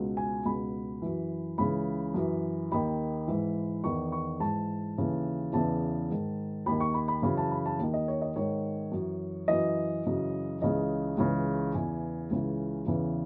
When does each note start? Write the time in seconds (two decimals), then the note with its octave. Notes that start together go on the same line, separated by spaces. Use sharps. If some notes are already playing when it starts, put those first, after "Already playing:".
Already playing: C#2 B2
0.17 G#5
0.45 C#2 B2 B5
1.02 F#2 E3
1.58 C#2 C#3 E3 B5
2.14 F#2 E3
2.72 D#2 D#3 B5
3.28 G#2 E3
3.84 E2 D#3 C#6
4.12 C#6
4.40 G#2 E3 A5
4.98 D#2 C#3 E3
5.53 E2 C#3 E3 A5
6.10 G#2 D#3
6.66 D#2 D#3 B5
6.80 C#6
6.94 B5
7.08 B5
7.22 F#2 C#3 E3 B5
7.37 A5
7.51 B5
7.66 A5
7.79 D#2 D#3
7.94 D#5
8.08 C#5
8.21 D#5
8.36 G#2 D#3 C#5
8.92 F#2 E3
9.48 F#2 E3 D#5
10.05 F#2 C#3 E3
10.61 C#2 C#3 E3 D#5
11.18 C#2 C#3 E3
11.74 E2 C#3 E3 G#5
12.31 C#2 C#3 E3
12.86 E2 C#3 E3